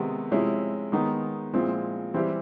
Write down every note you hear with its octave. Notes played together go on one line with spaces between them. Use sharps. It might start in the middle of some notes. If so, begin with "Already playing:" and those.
Already playing: C3 D#3 G#3 B3
C3 F3 G#3 C#4 E4
D#3 G#3 B3 D#4
A#2 F3 G#3 C4 E4
E3 G3 C4 E4 G4